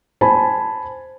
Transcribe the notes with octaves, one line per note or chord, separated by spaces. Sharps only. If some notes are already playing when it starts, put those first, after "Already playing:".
C5 G#5 A5 B5